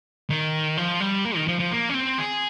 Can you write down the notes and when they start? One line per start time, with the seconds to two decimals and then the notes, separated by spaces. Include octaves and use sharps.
0.30 D#3
0.77 F3
1.00 G3
1.25 A#3
1.36 D#3
1.48 F3
1.59 F3
1.72 A#3
1.89 C#4
1.94 C4
2.18 G#4